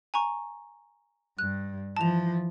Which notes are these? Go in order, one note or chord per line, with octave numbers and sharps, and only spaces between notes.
G#5 A#5 C#6
G2 F#6
E3 F3 A5 F7